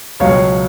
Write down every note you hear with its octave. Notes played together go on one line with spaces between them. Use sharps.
C#2 B2 F#3 C#5 F5